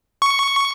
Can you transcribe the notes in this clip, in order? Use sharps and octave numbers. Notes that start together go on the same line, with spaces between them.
C#6